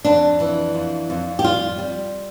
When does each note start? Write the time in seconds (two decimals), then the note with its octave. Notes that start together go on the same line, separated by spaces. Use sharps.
0.05 F2 D4
0.40 E3
0.75 F2
1.10 F2
1.39 G4
1.44 G3 F4
1.78 G3